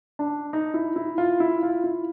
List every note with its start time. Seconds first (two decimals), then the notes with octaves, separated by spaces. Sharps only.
0.19 D4
0.53 D#4
0.74 E4
0.96 E4
1.18 F4
1.40 E4
1.63 F4
1.84 E4